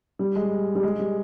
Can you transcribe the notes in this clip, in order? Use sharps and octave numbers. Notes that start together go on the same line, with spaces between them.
G3
G#3
G3
G#3
G3